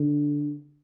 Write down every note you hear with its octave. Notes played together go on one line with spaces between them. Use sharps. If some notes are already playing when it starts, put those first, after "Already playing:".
Already playing: D3